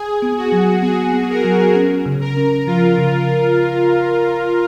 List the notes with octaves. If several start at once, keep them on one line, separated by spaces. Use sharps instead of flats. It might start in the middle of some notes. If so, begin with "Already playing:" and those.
Already playing: G#4
B3
F#4
F#3
B3 G#4
B3
A#4
F#3
C#4
C#3
A#4
C#4
F3 F4
C#3